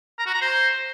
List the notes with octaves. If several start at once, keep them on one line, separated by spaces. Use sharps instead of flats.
A#5
F#4
A#5
C5